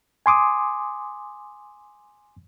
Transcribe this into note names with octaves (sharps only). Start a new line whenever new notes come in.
G#5 C6 D6 D#6